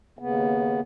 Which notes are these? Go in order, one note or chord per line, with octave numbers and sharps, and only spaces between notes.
D#2 C#3 B3